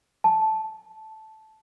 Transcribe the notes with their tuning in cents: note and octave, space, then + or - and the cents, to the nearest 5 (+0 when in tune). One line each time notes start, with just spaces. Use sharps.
A5 -10